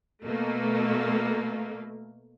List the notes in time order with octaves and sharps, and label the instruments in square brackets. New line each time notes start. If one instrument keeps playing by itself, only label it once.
[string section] B2 A3 A#3